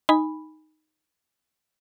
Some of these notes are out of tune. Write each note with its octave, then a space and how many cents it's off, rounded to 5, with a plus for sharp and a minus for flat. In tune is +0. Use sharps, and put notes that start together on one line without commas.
D#4 +0 G#5 -15 B5 +0